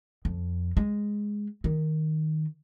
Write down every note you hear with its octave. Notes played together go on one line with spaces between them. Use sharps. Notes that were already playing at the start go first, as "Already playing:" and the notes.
F2
G#3
D#3